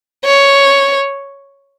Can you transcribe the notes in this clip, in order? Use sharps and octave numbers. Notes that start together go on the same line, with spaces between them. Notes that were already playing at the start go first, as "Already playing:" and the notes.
C#5